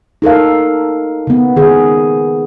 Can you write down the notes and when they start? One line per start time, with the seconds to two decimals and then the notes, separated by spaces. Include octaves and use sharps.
0.22 D#4 A4 A#4 F5
1.27 C#3 B3
1.56 D#3 G#4